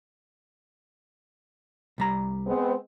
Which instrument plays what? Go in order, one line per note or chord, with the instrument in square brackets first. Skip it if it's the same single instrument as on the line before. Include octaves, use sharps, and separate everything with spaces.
[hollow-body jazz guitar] C2 G3 A#5
[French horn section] G#3 B3 C4